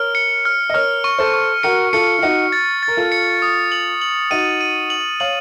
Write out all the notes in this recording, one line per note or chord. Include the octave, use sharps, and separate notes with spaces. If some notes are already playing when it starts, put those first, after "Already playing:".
Already playing: A#4 C#5 F6
C#7
F6
D#5
A#4 C#5 F6
C#6
A4 C5
C#6
F#4 A#4 C#7
F4 A4 C#7
F4
D#4 F#4 C#7
A6
A6
A#4
F4 A4
C#7
D#6
F#7
F#7
D#4 F#4 D#7
D#7
F#7
C#5 F5 F#7